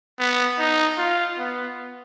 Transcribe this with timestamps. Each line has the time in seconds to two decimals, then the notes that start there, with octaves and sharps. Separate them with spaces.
0.19 B3
0.59 D#4
0.98 F4
1.38 B3